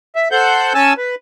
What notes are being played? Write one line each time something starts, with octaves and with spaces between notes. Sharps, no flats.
E5
A4 C5 F#5 G6
C#4 G#5 A5 E6
B4